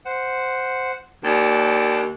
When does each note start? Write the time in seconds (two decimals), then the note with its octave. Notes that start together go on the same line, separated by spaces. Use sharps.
0.05 C5 F#5
1.24 D#2 D4 G5 A5